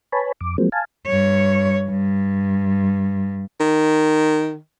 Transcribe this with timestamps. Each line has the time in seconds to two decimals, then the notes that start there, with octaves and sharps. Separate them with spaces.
0.12 B4 C#5 G#5 A5 B5
0.41 F2 D6
0.58 F3 F#3 G#3 A#3 C4
0.72 F5 G#5 A5
1.06 G2 C#5
1.89 G2
3.60 D#3